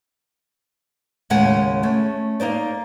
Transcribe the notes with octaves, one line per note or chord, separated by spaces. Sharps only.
D#2 A2 C#3 G#3 F#5 G#5
A3 C#4
A#3 D#4 C5 D5